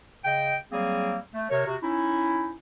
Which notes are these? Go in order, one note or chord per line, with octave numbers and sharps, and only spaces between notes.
C#3 D#5 G5
F#3 G3 A#3 C4 G#4
A3
C3 A#4 C#5
C3 F#4
C#4 D#4 E4